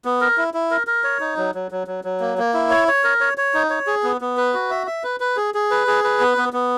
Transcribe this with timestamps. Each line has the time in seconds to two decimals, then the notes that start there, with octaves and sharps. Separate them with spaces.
0.05 B3
0.21 A#4
0.38 E4
0.54 E4
0.71 A#4
0.87 A#4
1.04 C#5
1.20 D#4
1.37 F#3
1.55 F#3
1.71 F#3
1.87 F#3
2.04 F#3
2.20 A#3
2.38 A#3
2.54 E4
2.70 C#5
2.88 C#5
3.04 A#4
3.21 C#5
3.38 C#5
3.54 D#4
3.70 C#5
3.87 G#4
4.03 B3
4.21 B3
4.37 B4
4.54 F#4
4.70 E5
4.87 E5
5.04 B4
5.20 B4
5.37 G#4
5.54 G#4
5.71 B4
5.87 G#4
6.04 B4
6.20 B3
6.38 B3
6.53 B3